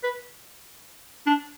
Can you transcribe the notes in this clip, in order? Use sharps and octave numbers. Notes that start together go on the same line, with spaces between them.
B4
D4